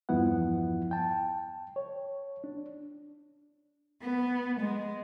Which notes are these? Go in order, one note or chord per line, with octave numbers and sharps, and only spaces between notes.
E2 G2 F3 B3 E4 F#5
G5 A5
C#5
D4
B3
G#3